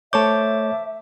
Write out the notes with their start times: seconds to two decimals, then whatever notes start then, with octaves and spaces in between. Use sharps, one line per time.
0.13 A3 C5 C#5 E5 A5 D6 G6